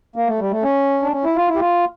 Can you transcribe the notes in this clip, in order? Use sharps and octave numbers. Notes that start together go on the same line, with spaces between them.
A#3
A3
G3
A3
C#4
D4
C#4
E4
F4
E4
G4
F4